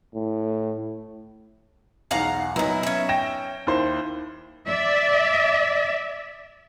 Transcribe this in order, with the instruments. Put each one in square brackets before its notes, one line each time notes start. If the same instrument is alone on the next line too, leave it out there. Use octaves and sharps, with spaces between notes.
[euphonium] A2
[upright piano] B1 E2 [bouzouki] F5 F#5 A#5
[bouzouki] A#2 E4 [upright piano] F#3 B3 D#4
[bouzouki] C#4 E5
[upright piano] G5 A#6 E7
D#2 E4 C5
[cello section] D5 E5